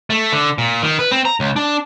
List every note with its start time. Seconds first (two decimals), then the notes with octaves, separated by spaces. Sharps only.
0.10 A3
0.32 D3
0.58 A#2
0.83 D#3
0.99 B4
1.11 C4
1.25 A#5
1.40 C#2
1.56 D4